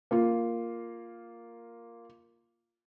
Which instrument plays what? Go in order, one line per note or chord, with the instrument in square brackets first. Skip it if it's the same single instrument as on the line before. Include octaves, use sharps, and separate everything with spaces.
[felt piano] A#3 F4